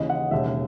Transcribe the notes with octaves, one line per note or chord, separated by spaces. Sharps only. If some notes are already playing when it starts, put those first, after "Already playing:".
Already playing: D#2 C#3 E3 D#5
F#5
E1 D#2 C#3 E5